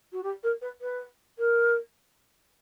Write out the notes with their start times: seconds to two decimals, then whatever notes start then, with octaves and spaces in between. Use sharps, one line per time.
0.12 F#4
0.23 G4
0.43 A#4
0.61 B4
0.81 B4
1.38 A#4